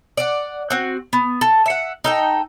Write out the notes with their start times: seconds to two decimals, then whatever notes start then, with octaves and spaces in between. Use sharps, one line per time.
0.17 D5 F#5
0.70 C4 F#4
1.13 B3
1.41 A4
1.66 E5 F#5
2.04 D#4 A4 G5